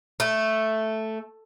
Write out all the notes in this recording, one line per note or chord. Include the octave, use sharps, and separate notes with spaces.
A3